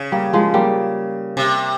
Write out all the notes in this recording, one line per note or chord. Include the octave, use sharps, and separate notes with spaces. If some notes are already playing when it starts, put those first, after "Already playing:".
Already playing: C#3
G3 A#3
F3 G#3
G3 A#3
C3